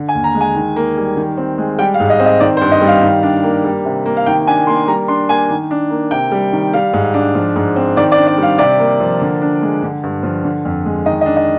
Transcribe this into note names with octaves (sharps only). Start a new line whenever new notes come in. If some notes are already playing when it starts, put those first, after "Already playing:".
Already playing: D3
G#5
D#2
A#5
G#3
G#5
D#3
A#3
G3
D#3
C4
G#3
G3 G5
F5
G#2
D#5
C4
D#5
D#3 D5
C5
G2
D#5
G3
F5
D#3
D4
A#3
G3
C3
A#3
F5
D#3 G5
D4 G#5
A#3 C6
G3 A#5
D4 C6
A#3 G#5
D#3
D4
A#3
C3 G5
G3
D#3
G3 F5
G#2
D4
F3
G#2
C4
D#3 D5
D5
D4
D5
G3 F5
C3 D5
A#3
F3
D3
D4
G#3
D3
G2
F3
D3
F2
G#3
D#3 D#5
D#5
D4
D#5